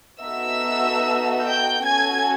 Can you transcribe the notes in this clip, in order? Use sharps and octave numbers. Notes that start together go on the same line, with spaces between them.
B3 D#4 F#4 A4 E5 E6
G5 G6
C#4 F#4 A4 G#5 G#6